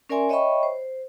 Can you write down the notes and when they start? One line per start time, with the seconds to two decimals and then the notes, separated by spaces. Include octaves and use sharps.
0.09 C#4 A#4 D5 E5 G#5 C6
0.29 C#5 D#5 E5 G5 B5 C#6
0.63 C5